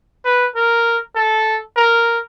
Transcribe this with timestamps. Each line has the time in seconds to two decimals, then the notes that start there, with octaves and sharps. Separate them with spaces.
0.25 B4
0.56 A#4
1.16 A4
1.76 A#4